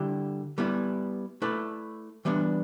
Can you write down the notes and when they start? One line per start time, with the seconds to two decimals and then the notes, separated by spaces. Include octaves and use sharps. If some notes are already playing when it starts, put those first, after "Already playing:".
Already playing: D3 G3 E4 G4
0.58 G3 B3 E4
1.42 A3 E4 B4 D5
2.25 E3 G3 B3 D4